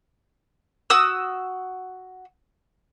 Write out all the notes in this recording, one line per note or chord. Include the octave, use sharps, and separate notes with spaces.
F#4 D#6 E6